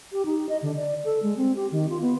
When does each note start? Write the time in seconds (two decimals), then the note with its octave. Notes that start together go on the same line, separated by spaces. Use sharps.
0.12 G4
0.25 D#4
0.49 D#5
0.62 D3
0.76 D5
1.05 A4
1.22 G#3
1.37 C4
1.56 G4
1.71 D#3
1.90 F4
2.02 B3